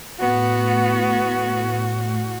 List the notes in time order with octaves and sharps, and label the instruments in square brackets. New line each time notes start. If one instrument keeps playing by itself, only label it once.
[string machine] A2 [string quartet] B3 [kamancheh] F#4